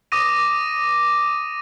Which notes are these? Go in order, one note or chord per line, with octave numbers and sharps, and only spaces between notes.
D6 D#6 A#6 D#7